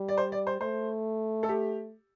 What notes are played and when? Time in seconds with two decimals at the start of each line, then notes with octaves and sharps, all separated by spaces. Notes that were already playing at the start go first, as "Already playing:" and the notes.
Already playing: G3
0.09 D5
0.17 C5
0.32 D5
0.47 C5
0.61 A3 C5
1.43 A4
1.49 G4